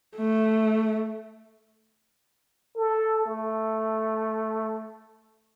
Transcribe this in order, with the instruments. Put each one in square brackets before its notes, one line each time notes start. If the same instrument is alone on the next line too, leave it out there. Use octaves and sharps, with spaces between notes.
[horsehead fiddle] A3
[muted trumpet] A4
A3